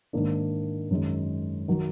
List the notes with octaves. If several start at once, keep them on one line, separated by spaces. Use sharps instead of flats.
G#2 D#3 A#3 D4
F#2 D#3 G#3
D#3 F#3